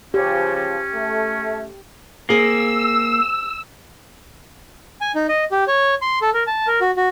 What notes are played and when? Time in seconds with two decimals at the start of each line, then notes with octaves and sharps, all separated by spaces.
0.14 C#3 F3 C#4 G4
0.55 C#4
0.94 A3
2.29 A#3 C4 G#4 E6
5.01 G#5
5.15 D#4
5.29 D#5
5.52 G4
5.68 C#5
6.02 C6
6.22 A4
6.34 A#4
6.47 A5
6.67 A#4
6.81 F#4
6.97 F#4